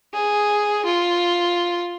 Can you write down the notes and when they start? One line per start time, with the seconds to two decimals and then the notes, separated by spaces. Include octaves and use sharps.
0.14 G#4
0.85 F4